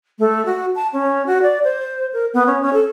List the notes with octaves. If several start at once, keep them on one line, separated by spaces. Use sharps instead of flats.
A3
F#4
A5
C#4
F#4
D5
C5
A#4
B3
C#4
C#4
A4